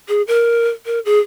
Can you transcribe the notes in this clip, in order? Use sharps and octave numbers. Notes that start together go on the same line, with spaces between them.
G#4
A#4
A#4
G#4